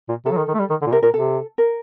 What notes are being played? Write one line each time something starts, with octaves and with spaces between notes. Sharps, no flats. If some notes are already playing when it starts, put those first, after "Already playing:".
A#2
C3 A4
F#3
D#3
D#3
A3
G3
D#3
D3
A#2
C3 A#4
A#2 A#4
C3 A4
A#4